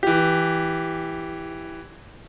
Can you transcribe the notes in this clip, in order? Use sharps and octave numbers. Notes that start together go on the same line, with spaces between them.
E3 G4